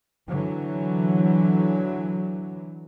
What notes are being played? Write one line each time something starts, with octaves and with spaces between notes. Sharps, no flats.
D3 E3 F#3